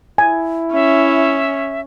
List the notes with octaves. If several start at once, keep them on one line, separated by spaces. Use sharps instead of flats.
E4 G#5
C#4 E5